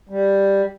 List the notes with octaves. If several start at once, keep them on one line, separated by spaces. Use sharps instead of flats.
G3